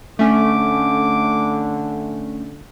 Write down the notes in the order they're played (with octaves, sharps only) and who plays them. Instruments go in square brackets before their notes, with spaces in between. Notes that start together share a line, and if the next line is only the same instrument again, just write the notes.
[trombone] D3 [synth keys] A3 C#4 [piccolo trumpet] D6